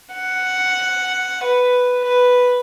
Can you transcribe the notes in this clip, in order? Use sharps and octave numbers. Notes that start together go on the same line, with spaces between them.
F#5
B4
B4